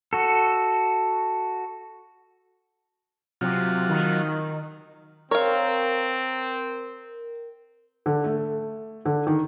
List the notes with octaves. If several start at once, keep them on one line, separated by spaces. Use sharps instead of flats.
F#4 A4
C3 F#3 F4
D#3
C4 A#4 C#5 F5
D3
A3
D3
D#3